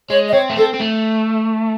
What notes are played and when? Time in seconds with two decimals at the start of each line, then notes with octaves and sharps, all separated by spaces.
0.09 G#3 C#5
0.28 D#5
0.33 C4 C#5
0.50 A3
0.57 C4 A4
0.74 C4
0.80 A3